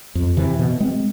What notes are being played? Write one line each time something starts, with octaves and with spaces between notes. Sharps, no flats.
F2
C3 E3
B2
G#3 C4